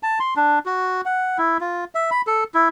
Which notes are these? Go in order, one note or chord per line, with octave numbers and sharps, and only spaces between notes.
A5
C6
D4
F#4
F#5
E4
F4
E5
B5
A4
E4